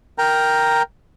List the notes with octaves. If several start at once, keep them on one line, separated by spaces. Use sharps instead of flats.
A#4 G5 A#5